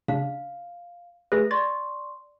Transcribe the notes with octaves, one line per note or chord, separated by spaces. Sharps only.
C#3 D4 F5
A3 G#4 B4 A#6
D5 C6 C#6 A6